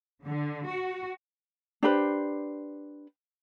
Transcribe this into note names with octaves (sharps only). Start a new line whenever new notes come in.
D3
F#4
D4 G4 B4 C5